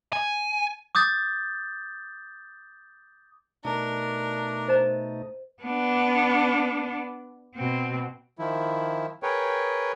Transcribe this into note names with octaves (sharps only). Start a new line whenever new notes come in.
G#5
D6 D#6 G6 A6
B2 A3 D4 D#4 A#4
C5 D#5 A#5
B3 D4
B2 C4
D#3 F3 E4
G#4 A#4 B4 C#5 G5